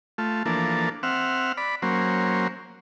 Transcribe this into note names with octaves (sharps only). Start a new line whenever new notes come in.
A3 F4
E3 F3 A#3 D4 A4
C4 E5 F#5 F6
D5 B5
F#3 A#3 C#4 C5